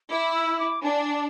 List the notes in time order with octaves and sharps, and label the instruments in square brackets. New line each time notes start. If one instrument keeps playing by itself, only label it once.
[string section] E4 [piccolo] D6
[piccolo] E6
D6
[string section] D4 [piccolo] G#5